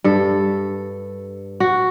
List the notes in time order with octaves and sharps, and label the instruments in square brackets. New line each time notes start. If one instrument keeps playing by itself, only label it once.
[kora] G2 A4
F#4